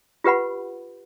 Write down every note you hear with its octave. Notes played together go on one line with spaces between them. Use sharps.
F4 G4 B4 F#5 B5